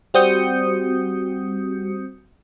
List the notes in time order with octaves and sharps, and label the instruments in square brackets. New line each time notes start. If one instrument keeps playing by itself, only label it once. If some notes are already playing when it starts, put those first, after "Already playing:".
[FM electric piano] G3 C4 F#4 D#6 G6 C#7